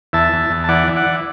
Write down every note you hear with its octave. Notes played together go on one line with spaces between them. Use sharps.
E2 E5 A5
E2
E2
A5
E3 D5 F#5
E3
D5 F#5
E3